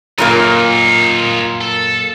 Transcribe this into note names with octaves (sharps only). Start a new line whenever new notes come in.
F#2 A#2 A#3 D#4 F4
A4